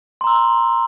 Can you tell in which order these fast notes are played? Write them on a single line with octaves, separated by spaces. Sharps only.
C6 A#5 E6